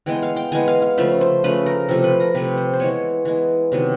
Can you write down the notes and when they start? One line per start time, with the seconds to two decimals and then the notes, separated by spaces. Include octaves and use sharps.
0.06 E3 G#3 B3 G5
0.22 F5
0.37 G5
0.52 E3 G#3 B3 G#5
0.68 F5
0.82 F5
0.98 C#3 F3 A3 E5
1.21 C5
1.44 C#3 F3 A3 B4
1.66 A#4
1.88 C3 F3 A3 A4
2.04 B4
2.20 A#4
2.35 C3 F3 A3 B4
2.58 C5
2.73 C5
2.80 E3 G#3 B3 C#5
3.25 E3 G#3 B3
3.72 C3 D#3 F#3 B3